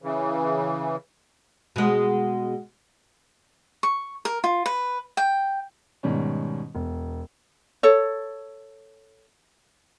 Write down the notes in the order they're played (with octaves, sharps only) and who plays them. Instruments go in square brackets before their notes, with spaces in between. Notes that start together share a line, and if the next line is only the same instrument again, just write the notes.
[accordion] C#3 E3
[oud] B2 G#3
[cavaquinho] C#6
A#4
F4
B4
G5
[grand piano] G#2 B2 D#3 G3 C#4
E1
[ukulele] A4 C#5